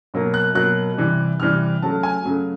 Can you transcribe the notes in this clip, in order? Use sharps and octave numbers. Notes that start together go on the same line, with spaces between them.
B2 F#3 A#3
F#6
B2 F#3 A#3 F#6
C3 E3 G3
C3 E3 G3 F6
C#3 F#3 A3 A5
G#5
C#3 F#3 A3